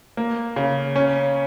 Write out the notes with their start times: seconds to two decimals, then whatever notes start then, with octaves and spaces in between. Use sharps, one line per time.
0.17 A#3
0.56 C#3
0.96 C#4